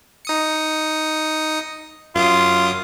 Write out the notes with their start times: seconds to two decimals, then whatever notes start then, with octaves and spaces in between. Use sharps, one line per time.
0.25 D#4 D#6 C#7
2.15 F#2 F4 D6 D#6